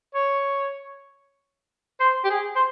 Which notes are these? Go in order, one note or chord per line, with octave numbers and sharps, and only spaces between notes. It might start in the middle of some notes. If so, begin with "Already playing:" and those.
C#5
C5
G4
G#4
C5